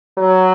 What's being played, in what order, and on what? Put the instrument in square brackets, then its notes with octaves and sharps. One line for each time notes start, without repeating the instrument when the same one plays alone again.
[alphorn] F#3